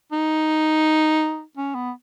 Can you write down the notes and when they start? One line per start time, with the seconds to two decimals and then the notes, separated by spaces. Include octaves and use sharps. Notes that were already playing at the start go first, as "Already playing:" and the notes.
0.12 D#4
1.57 C#4
1.75 B3